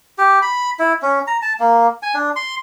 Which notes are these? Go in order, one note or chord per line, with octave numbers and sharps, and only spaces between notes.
G4
B5
E4
C#4
A#5
A5
A#3
G#5
D4
C6